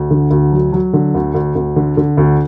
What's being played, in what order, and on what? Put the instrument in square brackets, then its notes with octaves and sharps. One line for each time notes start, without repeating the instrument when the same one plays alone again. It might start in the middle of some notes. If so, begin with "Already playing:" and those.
Already playing: [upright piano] D2
D3
D2
F#3
F#3
D3
D2
D2
D2
D3
D3
D2